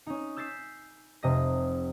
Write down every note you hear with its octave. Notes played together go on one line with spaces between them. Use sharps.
C#4 D#4
E6 G6 A6 B6 C7 E7
F1 C3 D#5 A#6